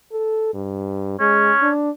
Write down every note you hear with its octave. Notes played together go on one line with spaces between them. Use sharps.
A4
G2
G#3 C#4
D4